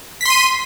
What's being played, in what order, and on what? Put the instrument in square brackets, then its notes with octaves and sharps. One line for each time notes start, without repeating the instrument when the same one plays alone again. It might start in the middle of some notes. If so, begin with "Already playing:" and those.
[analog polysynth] B6
C6
D#7